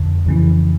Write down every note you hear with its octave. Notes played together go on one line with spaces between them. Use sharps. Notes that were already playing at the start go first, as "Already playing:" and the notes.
Already playing: F2 D3
F2 C#3 E3